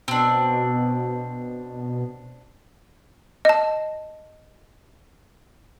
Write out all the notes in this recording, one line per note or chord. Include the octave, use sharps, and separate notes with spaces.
B2 C4 D4
D#5 A5